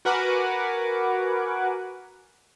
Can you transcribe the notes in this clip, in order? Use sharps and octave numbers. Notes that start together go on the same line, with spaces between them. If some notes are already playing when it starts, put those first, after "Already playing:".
F#4 A#4 B4 F#5 G#5 D6